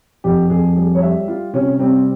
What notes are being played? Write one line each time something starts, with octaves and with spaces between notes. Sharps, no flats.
F2 G4
F2 G#4
G3 G#4
C#5
G3 E5
G3 F4
C3 C#4
G3 C4